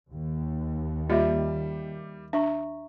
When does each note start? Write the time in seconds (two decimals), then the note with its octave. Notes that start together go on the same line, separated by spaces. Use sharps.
0.11 D#2
1.10 G3 A#3 F4 G4 D#5 E5
2.33 D4 E5 A#5 C#6